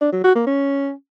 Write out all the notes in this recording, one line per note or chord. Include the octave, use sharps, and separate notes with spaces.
D4
F#3
F#4
A#3
C#4